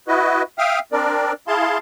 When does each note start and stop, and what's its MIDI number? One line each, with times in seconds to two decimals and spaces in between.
0.08 0.43 64
0.08 0.43 66
0.08 0.43 71
0.08 0.43 75
0.58 0.79 76
0.58 0.79 77
0.58 0.79 79
0.58 0.79 87
0.58 0.79 89
0.92 1.33 60
0.92 1.33 62
0.92 1.33 70
0.92 1.33 74
1.48 1.78 64
1.48 1.78 68
1.48 1.78 77
1.48 1.78 81
1.48 1.78 84